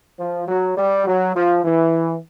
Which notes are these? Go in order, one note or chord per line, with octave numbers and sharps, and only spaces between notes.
F3
F#3
G3
F#3
F3
E3